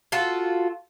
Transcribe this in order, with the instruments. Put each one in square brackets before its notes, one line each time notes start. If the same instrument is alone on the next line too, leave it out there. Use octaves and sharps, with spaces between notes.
[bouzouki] F4 F#4 A4